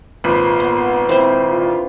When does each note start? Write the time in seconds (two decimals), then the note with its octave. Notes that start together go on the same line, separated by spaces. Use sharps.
0.24 G#1 A#2 F3 B4
0.60 B3 C6
1.09 C4 E4 C5
1.48 D3 F4